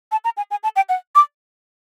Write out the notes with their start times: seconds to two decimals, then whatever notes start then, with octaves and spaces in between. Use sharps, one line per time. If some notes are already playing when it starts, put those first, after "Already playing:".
0.12 A5
0.25 A#5
0.37 G#5
0.51 G#5
0.63 A5
0.76 G5
0.89 F#5
1.15 D6